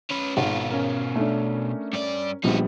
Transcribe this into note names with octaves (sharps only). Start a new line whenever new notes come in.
C#4 B4
G#1 B2 F4
C#4 A#4
A3 D4
G2 D5
A#1 F3 G3 B3 D#4 F#4